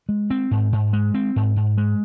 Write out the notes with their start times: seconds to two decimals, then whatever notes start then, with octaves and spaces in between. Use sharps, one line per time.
0.09 G#3
0.30 C4
0.51 G#2
0.73 G#2
0.93 G#3
1.14 C4
1.36 G#2
1.56 G#2
1.77 G#3